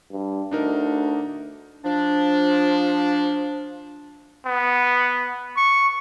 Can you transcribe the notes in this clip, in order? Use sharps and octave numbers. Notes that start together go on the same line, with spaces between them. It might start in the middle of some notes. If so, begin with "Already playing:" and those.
G2
D2 D4 D#4 A#4
F3 D4
B3
C#6